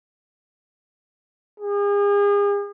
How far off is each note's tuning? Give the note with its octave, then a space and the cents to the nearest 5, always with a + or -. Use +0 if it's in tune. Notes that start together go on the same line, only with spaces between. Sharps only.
G#4 -40